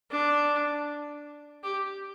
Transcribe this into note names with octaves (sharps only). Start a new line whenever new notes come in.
D4
G4